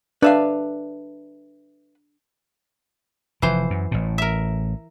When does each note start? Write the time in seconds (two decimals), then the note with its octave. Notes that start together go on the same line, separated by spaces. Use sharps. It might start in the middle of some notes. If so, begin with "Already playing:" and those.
0.22 D4 B4 E5 F5
3.42 F1 E3 F3 C5
3.70 F#2
3.91 A1 A2
4.18 A#4 E5